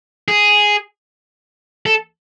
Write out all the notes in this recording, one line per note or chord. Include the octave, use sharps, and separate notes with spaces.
G#4
A4